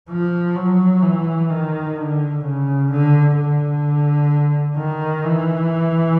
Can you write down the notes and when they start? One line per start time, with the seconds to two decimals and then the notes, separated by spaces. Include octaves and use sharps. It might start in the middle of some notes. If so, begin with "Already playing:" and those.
0.09 F3
0.56 F#3
1.02 E3
1.50 D#3
1.97 D3
2.44 C#3
2.91 D3
3.37 D3
4.78 D#3
5.25 E3